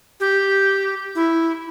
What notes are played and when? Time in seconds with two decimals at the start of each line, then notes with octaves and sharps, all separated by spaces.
0.20 G4
1.15 E4